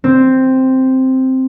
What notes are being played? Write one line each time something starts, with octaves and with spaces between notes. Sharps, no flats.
C4